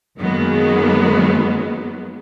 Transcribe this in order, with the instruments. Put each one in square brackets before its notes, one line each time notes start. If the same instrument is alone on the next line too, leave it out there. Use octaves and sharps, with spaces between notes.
[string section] F#2 D#3 F#3 G#3 A#3 B3